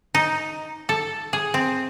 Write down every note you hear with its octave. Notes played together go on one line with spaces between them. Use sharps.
D#4
A4
G#4
C4